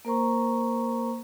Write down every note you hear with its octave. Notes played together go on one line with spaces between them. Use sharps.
A#3 A#4 C5 A#5 C#6